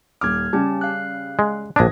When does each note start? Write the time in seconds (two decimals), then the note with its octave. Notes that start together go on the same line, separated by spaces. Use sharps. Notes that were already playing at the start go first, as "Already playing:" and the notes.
0.21 D#1 D6 F6 G#6
0.53 C#3 G3 C#4 G4 A5
0.81 F5 F#6
1.39 G#3
1.76 A#1 D4 D#6 G#6 A#6